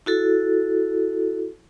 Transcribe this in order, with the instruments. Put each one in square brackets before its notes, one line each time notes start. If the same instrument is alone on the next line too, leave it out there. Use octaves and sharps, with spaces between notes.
[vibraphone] E4 F#4 A4